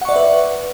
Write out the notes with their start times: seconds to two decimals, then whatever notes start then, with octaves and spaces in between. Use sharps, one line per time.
0.01 F#5
0.05 C#6
0.09 D5
0.12 E5
0.16 B4